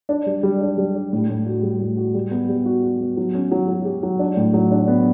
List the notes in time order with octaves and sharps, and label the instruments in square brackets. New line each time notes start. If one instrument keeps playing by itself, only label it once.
[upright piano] D4
G3
G3
D4
G3
D4
A2
A2
F#4
G3
A2
F#4
G3
B3
G3
F#4
F#4
B3
F#3
C#4
F#3
F#3
G4
F#3
D4
A2
F#3
D4
B3